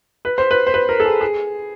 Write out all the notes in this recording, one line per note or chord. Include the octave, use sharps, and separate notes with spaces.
B4
C5
B4
C5
B4
A#4
A4
G#4
G#4